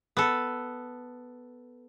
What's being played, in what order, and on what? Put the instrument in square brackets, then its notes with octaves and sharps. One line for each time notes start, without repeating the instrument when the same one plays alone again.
[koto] B3 A4